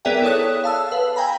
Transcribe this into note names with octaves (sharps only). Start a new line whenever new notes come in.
B3 G#4 A#4 D5 E5 G5
E4 A4 C#5 D#6 F#6
F5 A5 E6
B4 F5
G5 G#5 A#5 B5